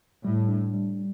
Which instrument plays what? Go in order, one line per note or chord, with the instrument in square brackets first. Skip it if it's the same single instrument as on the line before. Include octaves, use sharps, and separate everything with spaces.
[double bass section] A2 [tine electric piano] G3
[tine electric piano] D4
G3